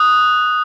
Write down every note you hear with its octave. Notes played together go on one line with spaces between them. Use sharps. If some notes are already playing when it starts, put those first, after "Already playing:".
Already playing: D#6 F#6